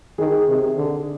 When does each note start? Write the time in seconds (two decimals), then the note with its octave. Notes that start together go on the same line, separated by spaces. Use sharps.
0.18 D#3 G#4
0.48 C3
0.77 D3